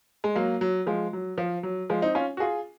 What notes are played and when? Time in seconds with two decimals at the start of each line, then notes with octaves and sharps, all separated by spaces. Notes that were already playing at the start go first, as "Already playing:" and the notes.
0.24 G#3
0.36 F#3 A#3
0.61 F#3
0.87 F3 G#3
1.13 F#3
1.38 F3
1.63 F#3
1.90 F3 G#3
2.02 C4 D#4
2.15 C#4 F4
2.37 F#4
2.40 F4 G#4